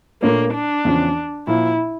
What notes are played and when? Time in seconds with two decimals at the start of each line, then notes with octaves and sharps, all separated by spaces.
0.22 A#2 A3 A#3 D4 F4 C#5
0.54 D4
0.85 E2 C#3 F3 C#4
1.47 A#2 F3 A#3 E4